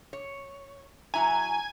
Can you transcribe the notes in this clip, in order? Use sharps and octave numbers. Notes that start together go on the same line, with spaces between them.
C#5
F#3 E4 G#5 A#5